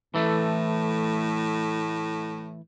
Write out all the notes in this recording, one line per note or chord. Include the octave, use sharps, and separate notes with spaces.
A2 E3 A3